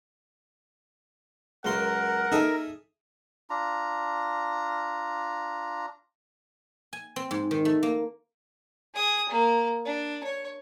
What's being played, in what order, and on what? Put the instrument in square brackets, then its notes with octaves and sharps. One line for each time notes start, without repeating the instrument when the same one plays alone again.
[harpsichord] C#2 F#2 C6 [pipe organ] A#4 [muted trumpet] F#5
[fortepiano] D#4 A4 [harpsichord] G#4 E5
[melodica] D4 F4 A#5
[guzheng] G#5
C4
G#2
D#3
A3
A#3
[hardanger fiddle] G#4 D#6
A#3
D4
C#5